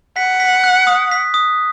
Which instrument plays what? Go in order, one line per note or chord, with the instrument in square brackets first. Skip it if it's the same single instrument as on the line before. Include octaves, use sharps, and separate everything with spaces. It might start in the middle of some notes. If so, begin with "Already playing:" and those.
[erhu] F#5 [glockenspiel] B6
[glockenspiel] B6
F#6
D#6
B6
D#6